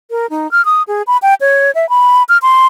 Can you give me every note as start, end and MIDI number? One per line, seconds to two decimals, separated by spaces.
0.11 0.29 70
0.30 0.50 63
0.51 0.64 89
0.65 0.83 87
0.88 1.02 68
1.07 1.17 83
1.22 1.34 79
1.41 1.71 73
1.75 1.88 76
1.89 2.23 83
2.29 2.38 89
2.42 2.67 84